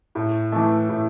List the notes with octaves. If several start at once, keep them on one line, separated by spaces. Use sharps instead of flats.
A2
E3 A3
A2